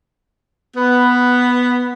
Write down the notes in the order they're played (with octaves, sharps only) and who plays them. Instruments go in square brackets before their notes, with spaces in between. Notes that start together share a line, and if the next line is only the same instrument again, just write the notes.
[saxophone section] B3